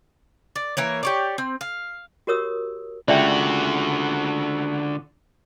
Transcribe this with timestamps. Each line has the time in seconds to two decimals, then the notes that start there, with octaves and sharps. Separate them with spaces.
0.56 D5
0.77 E3 A#3 C#5
1.03 G4 C#5 D5
1.38 C4
1.61 F5
2.27 F#4 G4 A#4 C#5 D#6 E6
3.08 C#2 D3 F#4 D5 E5 G5